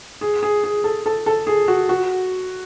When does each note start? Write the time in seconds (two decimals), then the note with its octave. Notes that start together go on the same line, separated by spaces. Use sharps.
0.21 G#4
0.43 G#4
0.64 G#4
0.84 A4
1.06 A4
1.26 A4
1.47 G#4
1.68 F#4
1.89 F#4